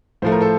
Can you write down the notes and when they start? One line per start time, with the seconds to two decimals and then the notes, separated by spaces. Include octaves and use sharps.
0.22 A2 F3 A3 C5
0.32 A#4
0.41 A4 C5